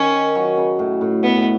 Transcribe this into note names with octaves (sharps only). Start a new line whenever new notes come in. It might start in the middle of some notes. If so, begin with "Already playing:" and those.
Already playing: D#3 C#4
F#3
C#3
A2
A2
B2 B3
A2